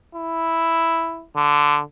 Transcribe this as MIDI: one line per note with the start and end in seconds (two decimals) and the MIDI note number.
0.15 1.24 64
1.36 1.80 50